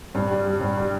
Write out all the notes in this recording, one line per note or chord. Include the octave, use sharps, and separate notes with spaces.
G2
G3
G3
G2
G3